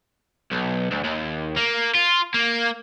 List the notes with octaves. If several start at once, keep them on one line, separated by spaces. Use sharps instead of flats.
B1
D2
D#2
A#3
F4
A#3